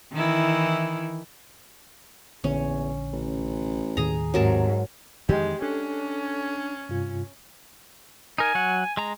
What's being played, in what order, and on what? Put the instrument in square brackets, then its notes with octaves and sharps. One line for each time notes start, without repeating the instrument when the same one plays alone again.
[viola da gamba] D#3 E3 E4
[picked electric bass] A#1 D3 [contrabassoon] E2 [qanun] C#4
[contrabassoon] A1
[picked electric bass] D#2 A2 D#3 [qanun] G#4 A#5
[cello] G#2 [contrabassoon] C3 [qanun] F#3 A#4 A5
[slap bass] F2 D#3 E3 [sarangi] G#3 [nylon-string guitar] G4
[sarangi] C#4 [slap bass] D4 [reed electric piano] A4
[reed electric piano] G2 C3 F4
[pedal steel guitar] D#4 A#4 [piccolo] G#5
[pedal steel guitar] F#3 F#5
G#3 A#5